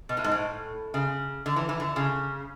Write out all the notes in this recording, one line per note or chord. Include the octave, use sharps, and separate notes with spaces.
B2
A2
G#2
A2
C#3
D3
E3
E3
D3
C#3